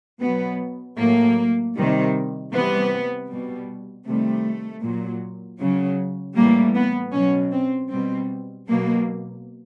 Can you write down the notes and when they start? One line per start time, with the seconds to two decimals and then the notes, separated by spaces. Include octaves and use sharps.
0.22 B2 F#3 B3
0.99 A2 F#3 A#3
1.76 C3 D#3 G3
2.53 C3 E3 G3 B3
3.30 B2 G3
4.06 C3 D#3 G3 A3
4.83 A#2 F#3
5.60 C#3 F#3
6.36 A2 E3 G3 A#3
6.75 B3
7.13 B2 F#3 C#4
7.52 C4
7.90 B2 G3 C4
8.67 B2 F#3 A#3